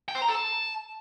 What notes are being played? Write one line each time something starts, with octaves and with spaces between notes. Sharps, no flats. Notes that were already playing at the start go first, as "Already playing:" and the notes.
G5
C5
A#5
A4
A5